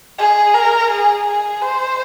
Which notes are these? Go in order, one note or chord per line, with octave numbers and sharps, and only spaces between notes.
G#4
A#4
G#4
G#4
C5